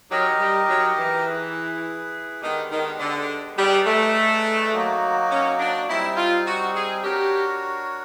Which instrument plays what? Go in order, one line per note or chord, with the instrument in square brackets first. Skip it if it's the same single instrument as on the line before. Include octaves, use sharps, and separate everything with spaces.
[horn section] F#3 [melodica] D#4 G4 A#4 D#5
[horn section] G3
F#3
E3
[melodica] E4 G#4 B4
[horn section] D#3 [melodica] G#3 B3 D4 G4
[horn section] D#3
D3
[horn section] G3 [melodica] D#4 G#4 B4 D5
[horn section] A3
[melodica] F#3 A#3 D#4 F#4
[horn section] C#4
D4
[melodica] G3 C4 D#4 [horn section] E4
[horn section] F4
F#4
G#4
[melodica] D4 F#4 A#4 C#5 [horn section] G4